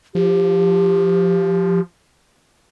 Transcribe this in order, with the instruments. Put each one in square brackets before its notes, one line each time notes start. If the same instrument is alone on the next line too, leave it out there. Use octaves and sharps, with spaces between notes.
[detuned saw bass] F3 [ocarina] G4